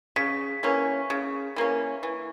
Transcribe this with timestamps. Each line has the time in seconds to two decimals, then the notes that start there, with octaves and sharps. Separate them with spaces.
0.16 C#3 B6
0.63 E3 A#3 C#4
1.10 C#3
1.56 E3 A#3 C#4
2.03 E3